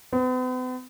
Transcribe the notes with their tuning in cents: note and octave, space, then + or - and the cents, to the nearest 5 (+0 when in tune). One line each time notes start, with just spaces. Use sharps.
B3 +45